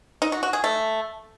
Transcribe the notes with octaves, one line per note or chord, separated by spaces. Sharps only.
D#4
F#4
F#4
G#4
A3